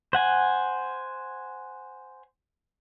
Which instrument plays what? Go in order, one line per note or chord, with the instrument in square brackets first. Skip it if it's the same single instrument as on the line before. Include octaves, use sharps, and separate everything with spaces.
[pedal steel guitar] C5 F#5 G#5